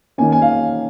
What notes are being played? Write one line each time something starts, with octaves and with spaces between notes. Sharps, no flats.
D#3 A#3 C#4 G#5
G#5
F5